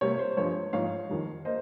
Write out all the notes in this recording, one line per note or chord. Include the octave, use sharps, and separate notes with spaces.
C3 G3 A#3 C#5
C5
G2 F3 G#3 C#5
G#2 F3 G#3 C#5 F5
F2 D#3 G3
A#3 C5 D#5